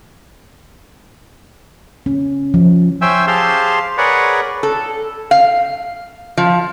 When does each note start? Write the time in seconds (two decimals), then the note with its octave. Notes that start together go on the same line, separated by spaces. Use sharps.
2.06 C#4
2.54 F3
3.02 C#4 C5 E5 G5 G#5 E6
3.27 G4 G#4 C5 F5 A5 C6
3.98 G#4 A#4 B4 C#5 D5 F#5
4.63 A4
5.31 F5
6.37 F3